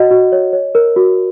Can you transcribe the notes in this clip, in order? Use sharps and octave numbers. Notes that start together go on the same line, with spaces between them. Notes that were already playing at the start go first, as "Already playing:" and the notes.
Already playing: F#4 C#5 D#5 F#5
F#4
C#5
C#5
A#4
F#4